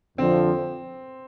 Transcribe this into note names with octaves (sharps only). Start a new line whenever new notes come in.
F2 D3 F3 C4